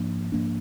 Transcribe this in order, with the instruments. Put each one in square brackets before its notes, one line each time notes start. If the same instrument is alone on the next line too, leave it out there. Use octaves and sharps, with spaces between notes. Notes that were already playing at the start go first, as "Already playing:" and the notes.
Already playing: [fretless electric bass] G#2 F3 A#3 D4
G#2 F3 A#3 D4